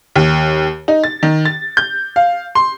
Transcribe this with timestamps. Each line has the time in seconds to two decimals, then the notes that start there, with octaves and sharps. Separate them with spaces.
0.16 D#2
0.88 D#4
1.04 A6
1.23 D#3
1.45 A6
1.77 G6
2.16 F5
2.55 C6